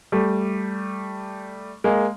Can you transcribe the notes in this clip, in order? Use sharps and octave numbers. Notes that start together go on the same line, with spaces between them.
G3 A3
G#3 A#3